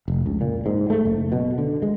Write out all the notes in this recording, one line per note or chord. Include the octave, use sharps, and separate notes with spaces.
F1
C#2
A#2
G#2
A3
F#1
B2
D3
G#3